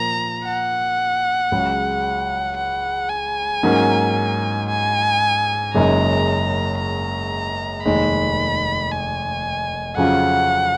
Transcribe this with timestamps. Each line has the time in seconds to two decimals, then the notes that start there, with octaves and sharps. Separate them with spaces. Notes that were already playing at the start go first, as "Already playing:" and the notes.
Already playing: A#2 F3 A#3 A#5
0.46 F#5
1.52 C#2 C#3 F#3
2.57 F#5
3.10 G#5
3.63 G#2 F#3 A#3 C#4
4.69 G#5
5.74 F#1 F#2 C#3 G#3 D#4 A#5
6.80 A#5
7.85 F1 D#2 D#3 G#3 B5
8.92 G#5
9.97 F2 C#3 F#3 C#4 F4 F#5